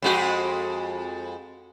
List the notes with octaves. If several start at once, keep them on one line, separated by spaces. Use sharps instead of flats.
F2 G#3 F#4